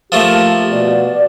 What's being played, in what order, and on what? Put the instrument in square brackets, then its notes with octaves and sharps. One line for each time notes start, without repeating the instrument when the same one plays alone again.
[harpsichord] F3 A3 A#3 [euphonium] G4
[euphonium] B2 [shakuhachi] D5